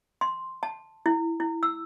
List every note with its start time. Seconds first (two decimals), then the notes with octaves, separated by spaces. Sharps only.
0.21 C6
0.63 A5
1.06 E4
1.40 E4
1.63 E6